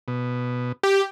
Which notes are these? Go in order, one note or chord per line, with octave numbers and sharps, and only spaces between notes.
B2
G4